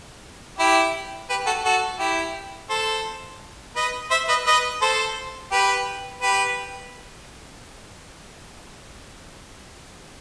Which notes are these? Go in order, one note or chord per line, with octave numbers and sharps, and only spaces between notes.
E4 G4
G4 B4
F#4 A4
F#4 A4
E4 G4
A4 C5
B4 D#5
C5 E5
B4 D#5
B4 D#5
A4 C5
G4 B4
G4 B4